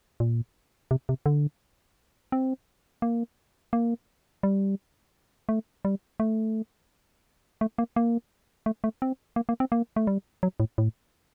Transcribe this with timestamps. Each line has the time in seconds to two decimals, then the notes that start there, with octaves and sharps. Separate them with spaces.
0.20 A#2
0.91 C3
1.09 C3
1.26 D3
2.32 C4
3.02 A#3
3.73 A#3
4.43 G3
5.49 A3
5.85 G3
6.20 A3
7.61 A3
7.78 A#3
7.96 A#3
8.66 A3
8.84 A3
9.02 C4
9.36 A#3
9.49 A#3
9.60 C4
9.72 A#3
9.96 A3
10.07 G3
10.43 F#3
10.60 A2
10.78 A2